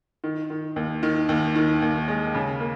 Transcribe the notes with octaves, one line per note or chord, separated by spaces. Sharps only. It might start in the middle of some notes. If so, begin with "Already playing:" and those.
D#3
D#3
D#2
D#3
D#2
D#3
D#2
G#3
C#3
A#3